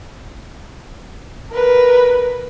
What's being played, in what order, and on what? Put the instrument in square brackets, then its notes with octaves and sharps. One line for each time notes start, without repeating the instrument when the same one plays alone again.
[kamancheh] A#4 B4